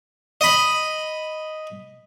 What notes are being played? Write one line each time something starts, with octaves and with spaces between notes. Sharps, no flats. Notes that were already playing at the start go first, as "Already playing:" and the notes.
D#5 B5